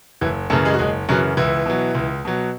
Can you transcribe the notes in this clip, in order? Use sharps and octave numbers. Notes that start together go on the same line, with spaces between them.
F#1 E3 E4
F#2 C#3 E3 A3 A4
G#3 G#4
F#4
F#1 G#3 G#4
F#2 C#3 E3 F#3 F#4
C#2 E3 E4
B2 F#3
C#2
B2 F#3